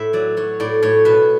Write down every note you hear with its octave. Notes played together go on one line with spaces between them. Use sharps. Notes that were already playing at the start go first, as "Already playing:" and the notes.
Already playing: A2 E5
F#3 D5
F#3 C#5
A2 D5
A2 C#5
B2 B4